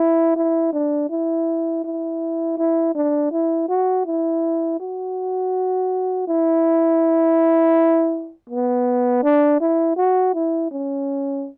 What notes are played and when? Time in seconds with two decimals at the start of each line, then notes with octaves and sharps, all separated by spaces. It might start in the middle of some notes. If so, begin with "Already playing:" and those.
Already playing: E4
0.36 E4
0.73 D4
1.10 E4
1.84 E4
2.58 E4
2.95 D4
3.32 E4
3.69 F#4
4.06 E4
4.80 F#4
6.28 E4
8.50 B3
9.23 D4
9.61 E4
9.97 F#4
10.35 E4
10.71 C#4